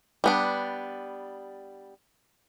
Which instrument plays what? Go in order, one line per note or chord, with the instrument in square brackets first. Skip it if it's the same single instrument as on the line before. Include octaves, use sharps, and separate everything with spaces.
[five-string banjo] G3 B3 D4